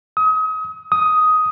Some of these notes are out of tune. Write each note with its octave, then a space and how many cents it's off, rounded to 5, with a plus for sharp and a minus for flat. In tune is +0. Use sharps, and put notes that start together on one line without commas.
D#6 +35
D#6 +10